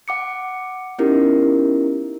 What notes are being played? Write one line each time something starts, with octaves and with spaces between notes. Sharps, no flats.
F#5 D6 C#7
B3 C#4 D#4 E4 G4 A#4